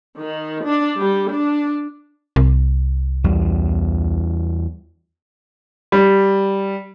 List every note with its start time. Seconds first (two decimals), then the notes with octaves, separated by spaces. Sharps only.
0.18 D#3
0.65 D4
0.98 G3
1.32 D4
2.36 C2
3.24 E2 G3
5.92 G3